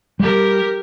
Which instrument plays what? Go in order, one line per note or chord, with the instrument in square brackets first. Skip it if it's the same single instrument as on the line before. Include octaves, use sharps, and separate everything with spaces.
[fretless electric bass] G3 [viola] G4 A#4